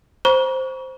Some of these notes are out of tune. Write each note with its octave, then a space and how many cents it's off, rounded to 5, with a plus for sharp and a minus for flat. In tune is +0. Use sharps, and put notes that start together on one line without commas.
C5 +0 A#5 +45 C#6 +30